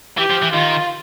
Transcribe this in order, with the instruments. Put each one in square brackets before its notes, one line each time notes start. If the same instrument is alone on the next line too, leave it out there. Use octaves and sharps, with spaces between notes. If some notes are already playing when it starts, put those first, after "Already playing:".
[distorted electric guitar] E3 [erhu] G4
[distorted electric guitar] F3
E3
[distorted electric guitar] D#3 [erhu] F4